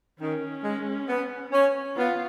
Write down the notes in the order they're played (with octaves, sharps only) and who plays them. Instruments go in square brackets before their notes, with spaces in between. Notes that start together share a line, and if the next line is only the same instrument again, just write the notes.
[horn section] D#3 [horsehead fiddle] C#4
[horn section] G#3
B3
C#4
[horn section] B3 [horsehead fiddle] F4